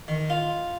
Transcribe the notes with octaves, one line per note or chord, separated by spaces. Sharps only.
D#3
F4